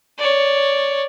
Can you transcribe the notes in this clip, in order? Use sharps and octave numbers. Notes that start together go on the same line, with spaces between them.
C#5 D5